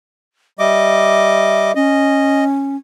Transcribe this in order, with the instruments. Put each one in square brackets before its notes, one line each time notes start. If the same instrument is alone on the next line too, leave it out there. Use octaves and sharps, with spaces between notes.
[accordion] G3 D#5 D6 [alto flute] E5
[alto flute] C#4 [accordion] D#5